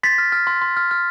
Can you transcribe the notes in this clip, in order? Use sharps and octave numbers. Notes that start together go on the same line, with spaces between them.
C6 A6 B6
F6
F6
C6
C6
F6
F6